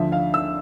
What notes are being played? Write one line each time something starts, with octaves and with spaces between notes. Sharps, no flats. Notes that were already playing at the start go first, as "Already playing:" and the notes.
Already playing: D2 D3 F3 E5
F5
E6